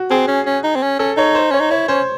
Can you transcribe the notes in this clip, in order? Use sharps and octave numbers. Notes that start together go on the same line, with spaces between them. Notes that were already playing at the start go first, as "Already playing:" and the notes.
Already playing: F#4
C4 G#4
C#4
C#4
D#4
C4
C#4
C#4 A4
D#4 C#5
C5
C#4 C#5
D#4
E4 C#5
C#4 C5